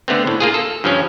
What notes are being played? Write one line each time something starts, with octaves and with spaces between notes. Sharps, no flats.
D3 A3 B3 C4
A2
A#3 F4 G#4
A4
G2 F3 C#4